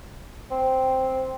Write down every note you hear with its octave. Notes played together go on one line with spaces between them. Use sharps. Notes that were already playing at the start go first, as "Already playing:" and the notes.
C4